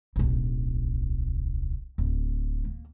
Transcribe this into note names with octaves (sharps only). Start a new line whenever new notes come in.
D1 B1
D1
A#3